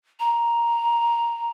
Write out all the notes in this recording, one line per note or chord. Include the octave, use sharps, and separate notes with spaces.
A#5